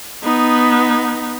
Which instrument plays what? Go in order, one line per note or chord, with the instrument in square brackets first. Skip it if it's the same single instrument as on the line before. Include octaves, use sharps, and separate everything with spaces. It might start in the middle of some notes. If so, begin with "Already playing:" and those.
[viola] B3 D#4